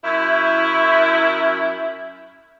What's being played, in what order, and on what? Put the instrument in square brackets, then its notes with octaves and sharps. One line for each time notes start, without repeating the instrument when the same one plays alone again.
[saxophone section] F#2 E4